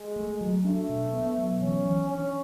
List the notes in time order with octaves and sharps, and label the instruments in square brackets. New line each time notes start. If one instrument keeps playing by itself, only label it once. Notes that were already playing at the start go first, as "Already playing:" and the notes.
Already playing: [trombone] G#3
[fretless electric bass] A3
F#3
[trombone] A3 [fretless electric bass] D4
[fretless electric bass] B2
B3
F#3
[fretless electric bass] E3 [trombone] C#4
[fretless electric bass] E3
[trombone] C#4 [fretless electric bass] D4